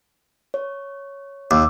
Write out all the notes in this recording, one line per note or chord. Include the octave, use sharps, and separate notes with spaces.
C#5
D#2 D6 E6